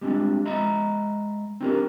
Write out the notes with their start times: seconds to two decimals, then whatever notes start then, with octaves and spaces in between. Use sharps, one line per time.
0.01 G3 G#3 C4 D4
0.45 G#3 D#5 E5 A#5 B5
1.61 C4 D4 D#4 G4 A#4